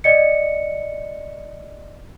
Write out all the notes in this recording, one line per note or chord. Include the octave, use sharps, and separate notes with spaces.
D5 D#5 C#7